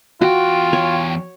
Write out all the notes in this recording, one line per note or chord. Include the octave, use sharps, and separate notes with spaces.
E2 F4 F#4 G5
C#5